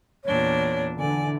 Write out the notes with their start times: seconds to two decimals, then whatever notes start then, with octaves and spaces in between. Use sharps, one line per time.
0.24 E2 A#2 D4 C#5
0.99 D3 E3 D5 G#5